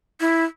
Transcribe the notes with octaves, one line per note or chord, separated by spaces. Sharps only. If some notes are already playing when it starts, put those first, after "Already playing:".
E4